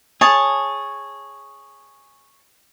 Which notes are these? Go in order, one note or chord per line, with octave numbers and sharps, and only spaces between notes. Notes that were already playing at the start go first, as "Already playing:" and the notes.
G#4 C#5 A5